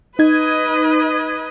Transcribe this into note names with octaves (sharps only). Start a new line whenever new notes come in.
D#4 B4 D#5 G#6